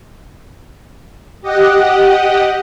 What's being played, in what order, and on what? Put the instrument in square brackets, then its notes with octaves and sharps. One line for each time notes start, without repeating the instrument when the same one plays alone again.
[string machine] G4 D#5 F#5